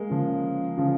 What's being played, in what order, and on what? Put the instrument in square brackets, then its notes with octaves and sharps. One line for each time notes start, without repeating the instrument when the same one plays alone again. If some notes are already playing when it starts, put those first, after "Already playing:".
Already playing: [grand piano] G#3 A#3
C#3 F3
C#3 F3